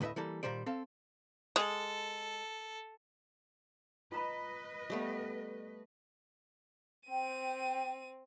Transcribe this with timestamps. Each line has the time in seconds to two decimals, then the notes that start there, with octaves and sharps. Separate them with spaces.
0.01 D2 A2 B4 D#5 E5
0.16 E3 G3 A#3 A4
0.43 A#2 D#3 G3 C5 D5
0.66 C4 A4 F5
1.56 G#3 A4
4.12 F4 B4 D#5 A#5 B5
4.90 G3 A3 B3
7.09 C4 G5 D#7